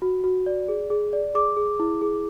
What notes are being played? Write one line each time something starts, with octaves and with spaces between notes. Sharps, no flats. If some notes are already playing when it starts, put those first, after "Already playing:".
F#4
F#4
D5
G#4
G#4
D5
G#4 D6
G#4
E4
G#4